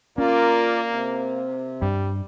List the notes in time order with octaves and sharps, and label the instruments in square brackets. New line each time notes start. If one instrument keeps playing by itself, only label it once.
[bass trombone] A#3 [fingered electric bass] C#4 [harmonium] F4 A#4 D5
[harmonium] C3
[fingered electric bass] G2 [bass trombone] G3